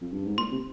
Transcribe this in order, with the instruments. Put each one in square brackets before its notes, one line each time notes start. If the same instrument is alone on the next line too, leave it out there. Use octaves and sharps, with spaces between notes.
[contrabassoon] F2
G2
G#2
[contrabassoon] A#2 [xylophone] C6
[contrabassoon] C3